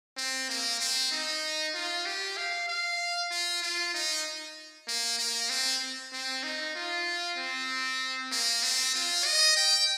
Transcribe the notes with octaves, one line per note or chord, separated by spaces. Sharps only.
C4
A#3
C4
D#4
F4
G4
F5
F5
F4
F4
D#4
A#3
A#3
C4
C4
D#4
F4
C4
A#3
C4
F4
D#5
G5